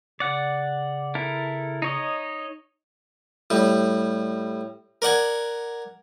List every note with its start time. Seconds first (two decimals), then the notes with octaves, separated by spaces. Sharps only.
0.20 C#3 D5 F#5
1.15 E4 A4 A#4
1.82 D#4 C#5 D#5
3.50 A2 G3
5.02 A#4 D5 F#5 G#5